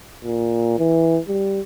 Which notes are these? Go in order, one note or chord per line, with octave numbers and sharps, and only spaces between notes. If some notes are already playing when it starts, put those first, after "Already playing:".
A#2
E3
G3